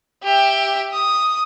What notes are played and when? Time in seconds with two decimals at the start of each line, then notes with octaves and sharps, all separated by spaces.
0.23 G4 E5
0.93 D#6